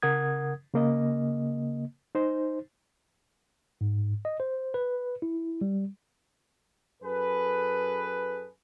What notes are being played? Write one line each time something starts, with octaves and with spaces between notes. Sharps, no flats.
C#3 A#4 F#5 D#6 G#6
C#3 A#3 D#5
D#4 C5
G#2
D#5
C5
B4
E4
G3
F#2 G#4 A4 B4